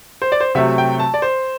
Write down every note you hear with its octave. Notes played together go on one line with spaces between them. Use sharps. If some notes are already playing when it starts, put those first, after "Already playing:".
C5
D5
C5
C3 F#3 A3 E5
G5
A5
D5
C5